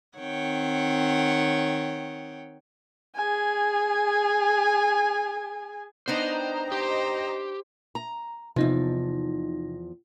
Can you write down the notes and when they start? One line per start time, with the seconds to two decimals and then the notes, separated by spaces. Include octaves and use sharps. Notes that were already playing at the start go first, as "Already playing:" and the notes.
0.17 D#3 C4 C#5 F#5 G5
3.16 G#4 G#5
6.08 B3 D4 D#4 C5 D#5 G5 A#5
6.72 G4 C5
7.95 A#5
8.56 E2 C3 F3 D#4